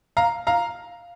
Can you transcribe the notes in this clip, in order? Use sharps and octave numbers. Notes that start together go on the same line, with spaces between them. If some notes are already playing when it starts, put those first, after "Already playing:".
F5 A#5
F5 A#5